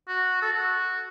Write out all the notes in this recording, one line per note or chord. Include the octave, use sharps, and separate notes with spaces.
F#4
A4
F#4